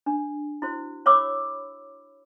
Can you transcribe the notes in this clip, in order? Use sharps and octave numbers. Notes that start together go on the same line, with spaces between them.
D4
E4 F#4 C5
C#5 F5 B5 D6 E6